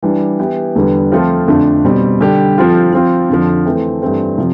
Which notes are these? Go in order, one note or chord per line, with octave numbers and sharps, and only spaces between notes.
E3 G3 D4
E3 B3 E4 G4
E2 D3 G3 B3
F3 A3 C4 F4 A4
F2 D3 A3 D4 F4
B2 G3 C4
D3 G3 D4 G4
F3 C4 F4 A4
F3 C4 F4
F2 D3 F3
E3 A3 C4
G2 E3 A3 C4
C3 F3